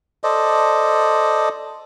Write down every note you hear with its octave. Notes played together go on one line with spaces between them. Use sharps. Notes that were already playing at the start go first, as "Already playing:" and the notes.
A4 C5 D5 D#5